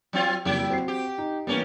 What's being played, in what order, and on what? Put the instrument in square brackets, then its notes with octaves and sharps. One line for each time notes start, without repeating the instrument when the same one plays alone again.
[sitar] F#3 C4 F4
[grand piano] F2 C#3 A#3 [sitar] F#3 E4 G4
[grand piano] C4 F#4 C7
[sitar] G4
[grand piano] D#4
[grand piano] E3 A#3 B3 [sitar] G3 C#4